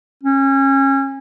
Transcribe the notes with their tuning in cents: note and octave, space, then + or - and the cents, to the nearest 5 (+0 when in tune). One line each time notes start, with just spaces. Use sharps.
C#4 -25